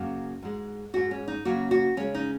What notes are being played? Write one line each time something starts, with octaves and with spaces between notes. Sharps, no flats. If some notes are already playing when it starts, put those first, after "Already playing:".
Already playing: F#2 C#3 A#3 F#4
G#2 G#3
G#2 G#3 F#4
C#4
D#4
C#3 F#3 A#3 F#4
F#4
C#3 G#3 C#4
D#4